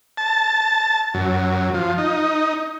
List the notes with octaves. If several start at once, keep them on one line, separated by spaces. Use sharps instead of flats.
A5
F#2
F3
D#4